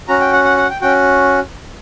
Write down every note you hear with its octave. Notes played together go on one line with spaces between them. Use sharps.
C#4 F#4 A#5
G5
F#5
F#5
F#5
G5
C#4 F#4 G5